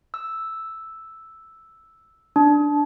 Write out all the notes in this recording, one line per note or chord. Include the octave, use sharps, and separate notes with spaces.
E6
D4